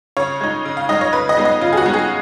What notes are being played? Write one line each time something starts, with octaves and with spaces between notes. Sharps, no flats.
C#3 C#5
G#3 D#4
C#3
F5
G#3 D#4 D#5
C#5
C#3 B4
D#5
G#3 B3 D#4
D#5
C#3 F4
G#4
F#4
G#3 B3 D#4
G#4